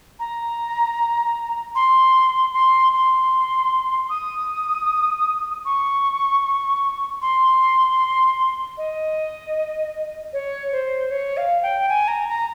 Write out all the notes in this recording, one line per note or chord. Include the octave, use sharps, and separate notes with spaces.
A#5
C6
C6
C6
D#6
C#6
C6
D#5
C#5
C5
C#5
F5
G5
G#5
A#5
A#5